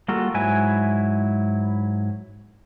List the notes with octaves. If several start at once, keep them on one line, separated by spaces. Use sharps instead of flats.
G3 A#3 F4 F#4 A4
G#2 F#3 E4 G#5